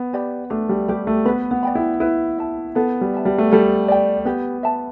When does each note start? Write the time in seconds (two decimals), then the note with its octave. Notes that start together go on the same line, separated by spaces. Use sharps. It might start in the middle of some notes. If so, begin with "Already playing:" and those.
Already playing: B3
0.13 G4 D5 B5
0.50 A3 D4
0.69 G3
0.88 G3 G4 B4
1.07 A3
1.25 B3 B4
1.51 B3
1.63 D5 G5 B5
1.75 E4
2.00 E4 B4
2.38 E5 A5
2.75 B3 A4
3.01 G3
3.14 E5 A5
3.25 G3
3.38 A3
3.51 G3 A4
3.88 D5 G5
4.25 B3 G4
4.63 E5 A5